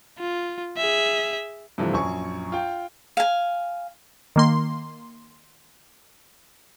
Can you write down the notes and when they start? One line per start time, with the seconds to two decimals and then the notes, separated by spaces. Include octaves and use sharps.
0.19 F4
0.77 G#4 E5
1.78 G2 C3 E3 F3 A3
1.93 A#1 F#2 G#5 C#6
2.52 F4 G5
3.17 F5 G#5
4.36 D#3 A#3 C6